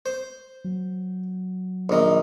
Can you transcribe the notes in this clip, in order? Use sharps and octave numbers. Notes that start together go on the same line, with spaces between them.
C5
F#3
A#1 D#3